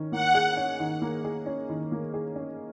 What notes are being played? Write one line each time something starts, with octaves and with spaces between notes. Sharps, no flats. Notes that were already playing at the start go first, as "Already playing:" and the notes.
Already playing: D#3 C#4
A#3 F#5
G#4
C#4
D#3
A#3
G#4
C#4
D#3
A#3
G#4
C#4